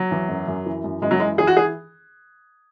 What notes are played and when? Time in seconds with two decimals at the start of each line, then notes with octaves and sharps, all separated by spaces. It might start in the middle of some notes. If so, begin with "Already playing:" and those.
Already playing: F#3
0.11 E2
0.29 F#2
0.47 F#2
0.66 E3
0.84 F#2
1.02 F#2 G#3
1.11 F#3
1.20 E3 G#3
1.38 E3 G#4
1.47 F#4
1.57 G#4